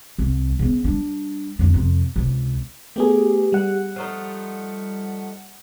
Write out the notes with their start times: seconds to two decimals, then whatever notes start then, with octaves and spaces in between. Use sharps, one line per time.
0.18 C2
0.59 C#3 B3
0.84 G3 D4
1.59 F2 D3
1.74 F2 C3
2.16 C#2 C3
2.96 A3 B3 G4 G#4
3.52 G3 F#5
3.96 F3 A3 D#4